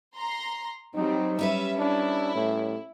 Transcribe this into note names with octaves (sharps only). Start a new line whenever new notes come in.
A#5 C6
F#3 G3 C4 D#4
G3 C#4 B4 E5
D4 E4
A2